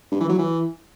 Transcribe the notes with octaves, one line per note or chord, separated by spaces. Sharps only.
G2
E3
F#3
E3